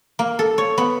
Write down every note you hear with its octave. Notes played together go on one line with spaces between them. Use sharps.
A#3
A4
C#5
B3